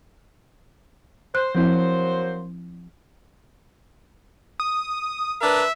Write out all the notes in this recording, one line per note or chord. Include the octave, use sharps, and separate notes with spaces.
C5 F#6
F3 F#3 A#3 C4 E4 C5
D#6
D4 A#4 B4 E5